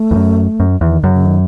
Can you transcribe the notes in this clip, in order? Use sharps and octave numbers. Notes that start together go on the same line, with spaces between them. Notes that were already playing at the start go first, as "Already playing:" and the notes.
Already playing: A3
E2
F#2
F#2
E2 D#3
F#2 C#3
C#3
D#3